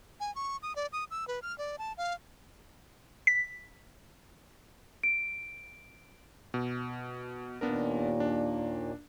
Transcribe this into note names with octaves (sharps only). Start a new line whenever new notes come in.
G#5
C#6
D#6
D5
D#6
E6
B4
F6
D5
A5
F5
B6
D7
B2
D#2 A#2 B3 D4 A#4
D4